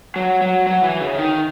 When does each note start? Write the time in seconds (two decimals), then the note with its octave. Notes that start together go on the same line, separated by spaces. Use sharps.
0.16 F#3
0.41 F#3
0.67 F#3
0.83 E3
1.00 C#3
1.17 D#3